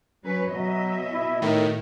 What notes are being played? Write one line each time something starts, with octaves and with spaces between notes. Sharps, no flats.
F#3 C#4 B4
B2 F#3 D#5 E5
E4
A2 D#3